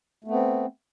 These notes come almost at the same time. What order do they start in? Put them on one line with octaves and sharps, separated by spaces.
A3 B3 C4